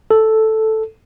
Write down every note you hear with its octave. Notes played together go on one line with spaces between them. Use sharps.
A4